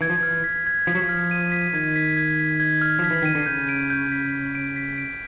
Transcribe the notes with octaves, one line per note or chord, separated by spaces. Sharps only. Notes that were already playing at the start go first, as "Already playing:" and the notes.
E3 G#6
F3
E3 F6
B6
G#6
F3 B6
F#3
F3
F6
D#7
B6
D#3 G#6
B6
G#6
B6
G#6
F6
F3 B6
E3
D#3 D#7
D3
C#3 G6
D7
G6
B6
B6
D7
B6
D7